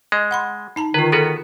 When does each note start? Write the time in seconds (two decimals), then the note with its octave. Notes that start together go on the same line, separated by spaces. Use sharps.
0.12 G#3 D#5
0.31 F#5 B5 C6
0.76 D#4 A5 A#5
0.94 D3 D#3 F4 B4
1.12 B3 F#4 G#4 A4 B4